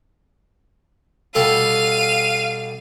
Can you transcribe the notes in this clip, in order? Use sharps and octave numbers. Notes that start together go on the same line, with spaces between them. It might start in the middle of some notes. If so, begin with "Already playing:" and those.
B2 G3 A4 F5 D#7